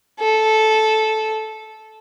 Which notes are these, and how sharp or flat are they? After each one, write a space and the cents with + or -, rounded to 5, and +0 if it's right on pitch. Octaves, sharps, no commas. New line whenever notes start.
A4 -10